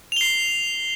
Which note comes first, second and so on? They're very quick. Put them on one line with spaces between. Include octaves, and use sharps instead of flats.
F7 G7 C7